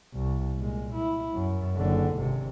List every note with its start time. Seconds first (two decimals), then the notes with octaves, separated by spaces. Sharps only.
0.13 C2
0.57 A#2 G#3
0.94 E4
1.34 F#2
1.76 F#1 D3
2.15 G#1 C3